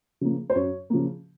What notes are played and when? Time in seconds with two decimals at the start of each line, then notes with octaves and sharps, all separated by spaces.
0.21 C#3 F3 A#3
0.50 C5
0.55 F#2 C#5
0.90 C#3 F3 A#3